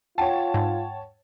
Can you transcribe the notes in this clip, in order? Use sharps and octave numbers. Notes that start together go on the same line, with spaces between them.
F4 C#5 F#5 G5 A5
G#2